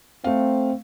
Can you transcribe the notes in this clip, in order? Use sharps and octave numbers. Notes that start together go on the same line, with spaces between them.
A3 C4 F5